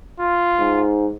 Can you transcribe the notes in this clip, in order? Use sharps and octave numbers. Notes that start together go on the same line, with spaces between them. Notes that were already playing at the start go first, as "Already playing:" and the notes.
F4
G#2